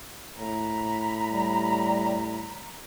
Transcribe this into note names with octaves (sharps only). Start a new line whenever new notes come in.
A2 A#5 B5
G3